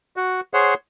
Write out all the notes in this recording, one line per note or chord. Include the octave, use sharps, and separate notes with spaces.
F#4
G#4 C5 C#5 F#5